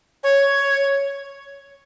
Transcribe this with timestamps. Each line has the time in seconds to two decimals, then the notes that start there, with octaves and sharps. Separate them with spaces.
0.23 C#5